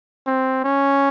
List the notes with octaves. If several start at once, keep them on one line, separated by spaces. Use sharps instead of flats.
C4
C#4